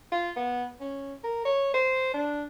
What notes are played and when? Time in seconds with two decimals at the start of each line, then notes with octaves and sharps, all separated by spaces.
0.12 F4
0.36 B3
0.80 C#4
1.24 A#4
1.45 C#5
1.74 C5
2.14 D4